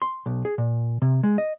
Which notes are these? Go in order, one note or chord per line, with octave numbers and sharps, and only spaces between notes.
C6
B1
G#4
A#2
C3
G#3
D#5